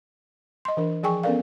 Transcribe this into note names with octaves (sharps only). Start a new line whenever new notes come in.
D#5 C6
E3 D4 A#4
F3 G#4 G5 G#5 C#6
B3 C#4 A4 A#4 D5 F5